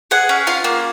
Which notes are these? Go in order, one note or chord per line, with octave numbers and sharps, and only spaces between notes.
G#4 F#5
C#4
F4 F5
A#3